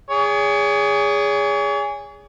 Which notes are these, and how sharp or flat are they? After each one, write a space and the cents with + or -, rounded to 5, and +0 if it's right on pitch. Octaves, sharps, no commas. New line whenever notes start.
G#4 -15 C#5 +40